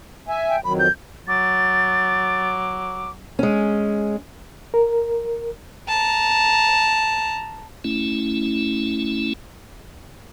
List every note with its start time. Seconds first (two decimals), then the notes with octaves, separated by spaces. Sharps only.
0.29 E5 G#5
0.49 G5
0.64 F2 D#3 F#3 B5
0.79 G6
1.28 F#3 D6 A6
3.39 G#3 C#4
4.74 A#4
5.89 A5 A#5
7.84 A3 C#4 E4